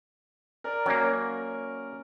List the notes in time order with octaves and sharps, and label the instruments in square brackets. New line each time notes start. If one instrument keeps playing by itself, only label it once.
[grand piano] A#4 D5
[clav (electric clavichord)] F#3 A#3 [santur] C#4